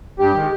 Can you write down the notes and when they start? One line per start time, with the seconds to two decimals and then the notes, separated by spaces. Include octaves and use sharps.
0.19 G2 G4
0.35 D#3 G#3